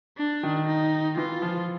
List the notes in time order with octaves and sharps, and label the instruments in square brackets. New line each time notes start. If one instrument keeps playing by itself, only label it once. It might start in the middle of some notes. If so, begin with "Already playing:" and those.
[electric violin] D4
[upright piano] D#3
[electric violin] D#4
[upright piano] E3 [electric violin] F4
[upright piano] F3